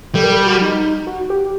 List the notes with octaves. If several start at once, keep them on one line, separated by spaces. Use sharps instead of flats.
G3 A4
A#4
A4
F#4
D#4
F#4
G4